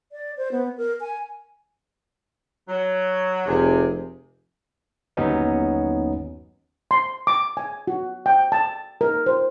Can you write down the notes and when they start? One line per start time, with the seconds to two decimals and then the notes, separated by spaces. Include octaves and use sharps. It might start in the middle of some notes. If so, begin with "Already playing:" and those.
0.12 D5
0.37 C5
0.52 B3
0.78 A#4
1.01 G#5
2.69 F#3
3.47 F1 C3 G#4
5.17 G1 D#2 F#3 B3 C#4 D#4
6.91 C6
7.27 D6
7.57 G#5
7.87 F#4
8.26 G5
8.52 A5
9.01 A#4
9.26 C5